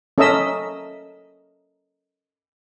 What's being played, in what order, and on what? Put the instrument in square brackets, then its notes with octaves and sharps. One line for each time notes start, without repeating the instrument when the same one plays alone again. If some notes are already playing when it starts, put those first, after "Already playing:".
[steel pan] C#4 A4 A#4 D#5 E5 E6